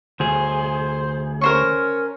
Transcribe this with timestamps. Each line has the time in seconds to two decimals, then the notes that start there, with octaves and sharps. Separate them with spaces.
0.20 D2 G#4 C5
1.41 C#4 A#4 C5 C#6